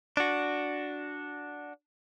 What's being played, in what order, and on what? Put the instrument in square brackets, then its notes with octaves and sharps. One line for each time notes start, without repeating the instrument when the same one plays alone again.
[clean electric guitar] D4 F#4